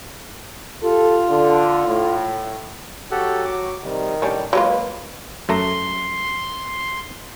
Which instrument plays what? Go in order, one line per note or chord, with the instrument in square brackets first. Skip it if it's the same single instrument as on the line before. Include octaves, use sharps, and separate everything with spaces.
[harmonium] F4 [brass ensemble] G4 A4
[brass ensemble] D3
A2
[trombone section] F#3 F#4 [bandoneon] G4 A4 F#5
[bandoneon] D6
[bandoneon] C3 G3 [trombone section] D#3
[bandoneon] A2 [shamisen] G3 C#4 D4
[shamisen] F#3 G#3 F4 [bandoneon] A#3 [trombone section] B4
[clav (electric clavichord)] F#2 A3 A#5 [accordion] C6